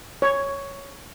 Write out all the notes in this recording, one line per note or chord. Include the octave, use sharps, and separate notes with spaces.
C#5